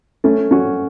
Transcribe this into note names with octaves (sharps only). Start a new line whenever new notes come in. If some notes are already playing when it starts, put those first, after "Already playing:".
A3 C#4
C#4 F#4